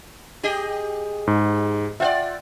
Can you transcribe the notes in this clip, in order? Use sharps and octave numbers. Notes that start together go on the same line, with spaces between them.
G4 G#4 D#5
G#2
F4 C5 D5 E5 F#5 G5